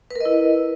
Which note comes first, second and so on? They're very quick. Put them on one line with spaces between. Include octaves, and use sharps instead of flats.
B4 A#4 D#5 E4